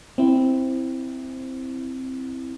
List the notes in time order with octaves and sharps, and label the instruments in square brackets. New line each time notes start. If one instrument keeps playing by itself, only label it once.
[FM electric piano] C4 E4